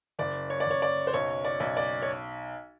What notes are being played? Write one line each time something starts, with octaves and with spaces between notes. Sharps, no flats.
F#1 D5
C#5
D5
F#1 C#5
D5
C5
B1 C#5
D5
B1
D5
C#5